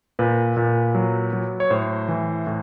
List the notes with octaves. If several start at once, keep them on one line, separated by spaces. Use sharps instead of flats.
A#2 B4
A#2
F#3
F#3
C#5
A2 C5
E3
A2